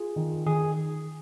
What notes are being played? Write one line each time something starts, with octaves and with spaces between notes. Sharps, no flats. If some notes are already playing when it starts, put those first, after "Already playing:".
Already playing: F4 G#4
D#3
D#3 G#4